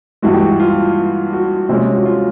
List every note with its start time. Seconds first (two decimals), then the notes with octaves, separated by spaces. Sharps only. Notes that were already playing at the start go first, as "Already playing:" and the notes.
0.22 G2 E3 G#3 F#4
0.34 G4
0.41 F#4
0.60 F4
1.33 F#4
1.69 C3 F3 G#3 C#4
1.95 F#4
2.05 F4